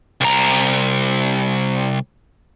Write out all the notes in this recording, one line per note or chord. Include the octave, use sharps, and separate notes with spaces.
C2 A#5